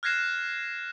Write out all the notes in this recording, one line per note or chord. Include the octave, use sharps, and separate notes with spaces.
F6 F#6 G#6 A#6 C7 E7